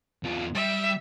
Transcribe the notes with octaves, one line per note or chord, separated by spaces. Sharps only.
E2 F4
G3 E5